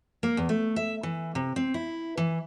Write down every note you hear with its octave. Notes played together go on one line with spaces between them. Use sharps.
A#3
E2
A3
E5
E3
C3
C4
E4
E3